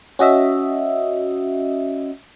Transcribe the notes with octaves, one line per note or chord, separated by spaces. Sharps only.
C#4 F#4 D#5 E5